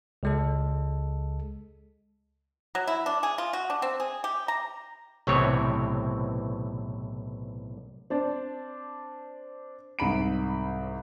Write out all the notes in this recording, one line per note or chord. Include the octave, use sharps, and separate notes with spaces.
C#2 G#3 A4
F#3
E4
D4
G#4
F4
F#4
D4
C4
G#4
G4
A#5
B1 A2 C3 E3 C4 C#5
C4 D4 D5
C2 G#2 B5 D7